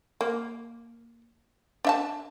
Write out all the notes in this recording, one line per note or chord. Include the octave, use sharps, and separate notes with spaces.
A#3
D4 E5 A5